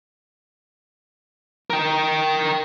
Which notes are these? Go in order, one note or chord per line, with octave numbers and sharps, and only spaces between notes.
A#4 G5